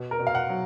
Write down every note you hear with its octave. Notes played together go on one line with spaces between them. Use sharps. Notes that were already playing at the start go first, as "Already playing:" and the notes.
Already playing: B2
A#4
B2
F5
F#5
F#3